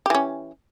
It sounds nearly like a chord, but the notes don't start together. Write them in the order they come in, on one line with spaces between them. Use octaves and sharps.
G4 E3 C#4